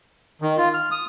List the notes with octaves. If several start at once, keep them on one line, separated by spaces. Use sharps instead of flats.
D#3
F4
F6
D#6